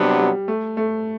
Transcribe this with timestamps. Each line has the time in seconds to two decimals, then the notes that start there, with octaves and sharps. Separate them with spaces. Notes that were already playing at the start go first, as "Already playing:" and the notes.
Already playing: C3 F#3 G3 B3 D4
0.19 G3
0.48 A3
0.77 A3